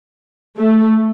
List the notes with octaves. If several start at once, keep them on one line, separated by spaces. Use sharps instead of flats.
A3